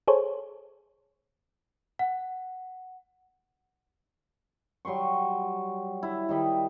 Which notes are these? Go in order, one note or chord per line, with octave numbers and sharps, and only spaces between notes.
G#4 A4 C5 C#5
F#5
F#3 G3 C6 C#6
E4
D#3 G3 D#5 B5